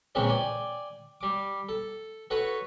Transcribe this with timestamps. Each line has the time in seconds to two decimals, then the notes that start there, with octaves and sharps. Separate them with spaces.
0.15 A#2 C#3 E3 G#3 C4 C#4
0.29 D5 G5 G#5
1.21 G3 D6
1.69 A4
2.30 F#4 A4 B4 C#5